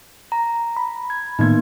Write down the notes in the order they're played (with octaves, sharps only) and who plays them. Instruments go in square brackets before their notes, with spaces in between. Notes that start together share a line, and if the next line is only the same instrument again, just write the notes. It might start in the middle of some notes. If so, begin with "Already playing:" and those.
[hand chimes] A#5
[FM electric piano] B5
[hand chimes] G#6
[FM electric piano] A2 D#3 G#6 [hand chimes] A#3 B3 D#4